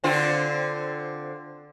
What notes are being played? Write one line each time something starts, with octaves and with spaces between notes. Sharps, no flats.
D3 C4 F4